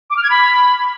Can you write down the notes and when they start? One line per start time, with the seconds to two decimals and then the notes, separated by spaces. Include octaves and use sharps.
0.10 D6
0.17 F6
0.24 G#6
0.30 B5